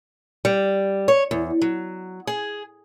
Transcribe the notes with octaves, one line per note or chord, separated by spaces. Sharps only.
G3
C#5
E2
F#3
G#4